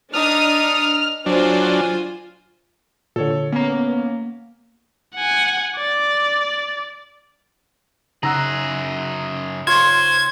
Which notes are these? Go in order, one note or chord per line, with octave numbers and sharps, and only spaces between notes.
D4 D#4 D#6 F6
F#3 D4 F4 C5 G#5
A#2 D3 A4 C#5
A#3 B3 C#4 A#5
F#5 G#5
D5
F#2 C#3 D#4 G#4 F#5 A#5 E6
F4 C5 C#5 G#6